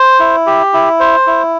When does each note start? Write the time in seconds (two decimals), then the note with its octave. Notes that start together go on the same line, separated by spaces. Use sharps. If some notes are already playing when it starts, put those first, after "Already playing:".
Already playing: C5
0.20 E4
0.47 G4
0.73 E4
1.00 C5
1.27 E4